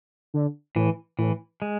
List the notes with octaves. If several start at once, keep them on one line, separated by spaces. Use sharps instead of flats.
D3
A2 E3
A2 E3
G#3